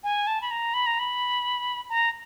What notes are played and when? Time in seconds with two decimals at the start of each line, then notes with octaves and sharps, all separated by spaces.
0.04 G#5
0.27 A5
0.41 B5
0.51 A#5
0.74 B5
0.86 A#5
0.99 B5
1.90 A#5